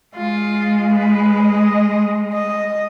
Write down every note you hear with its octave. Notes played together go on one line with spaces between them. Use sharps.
G#3 F4
B4
D#5
D#5